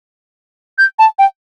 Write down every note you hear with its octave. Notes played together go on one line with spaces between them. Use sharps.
G6
A5
G5